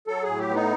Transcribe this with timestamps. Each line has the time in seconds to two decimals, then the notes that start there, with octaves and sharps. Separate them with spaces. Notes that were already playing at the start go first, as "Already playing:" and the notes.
0.07 F#3 A4
0.23 A2 G#4
0.39 G4
0.49 B3
0.55 D#4